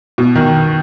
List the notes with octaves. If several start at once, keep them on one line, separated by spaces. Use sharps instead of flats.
B2
D#3